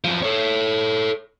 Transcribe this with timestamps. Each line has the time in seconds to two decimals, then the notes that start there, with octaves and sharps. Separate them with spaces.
0.04 F#2 F3
0.22 A4 C#5